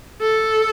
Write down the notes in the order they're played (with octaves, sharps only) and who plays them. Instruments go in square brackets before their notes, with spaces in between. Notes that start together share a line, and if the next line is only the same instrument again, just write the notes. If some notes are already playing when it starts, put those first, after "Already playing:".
[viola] A4